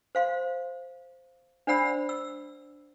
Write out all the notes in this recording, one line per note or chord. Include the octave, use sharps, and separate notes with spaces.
C5 F5 C6
D4 C5 D5 F#5 B5 E6
E6